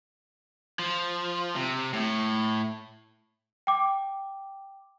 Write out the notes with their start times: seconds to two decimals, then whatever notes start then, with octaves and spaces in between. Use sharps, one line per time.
0.79 F3
1.56 C3
1.93 A2
3.67 G5 D6